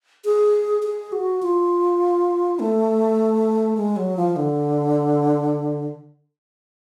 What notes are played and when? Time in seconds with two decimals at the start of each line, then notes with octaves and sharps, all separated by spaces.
0.25 G#4
0.83 G#4
1.12 F#4
1.42 F4
2.60 A3
3.77 G#3
3.96 F#3
4.17 F3
4.36 D3